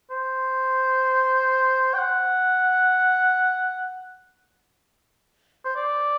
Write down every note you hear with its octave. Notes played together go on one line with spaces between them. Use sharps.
C5
G5
F#5
C5
D5